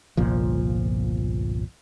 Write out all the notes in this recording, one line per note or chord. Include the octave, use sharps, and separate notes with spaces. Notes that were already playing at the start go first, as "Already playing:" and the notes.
G1 C2 A#2 F3